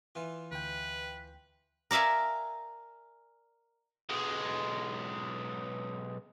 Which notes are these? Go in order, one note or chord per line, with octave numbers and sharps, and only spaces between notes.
E3 F4
D2 B4 G5
A#4 D5 E5 F5 G#5
B1 G#3